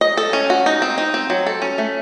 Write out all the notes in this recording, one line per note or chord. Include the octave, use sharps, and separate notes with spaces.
D#5
A4
C#4
F#4
D#4
C4
D#4
C4
F#3
A4
C#4
A3